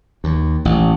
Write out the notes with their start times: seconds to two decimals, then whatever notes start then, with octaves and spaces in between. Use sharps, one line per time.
0.24 D#2
0.65 A1